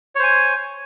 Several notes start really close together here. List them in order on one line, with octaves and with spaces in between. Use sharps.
C#5 C5 G#5